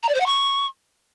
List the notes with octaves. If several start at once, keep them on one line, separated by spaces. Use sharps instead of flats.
A#5
D5
C5
F#5
C#6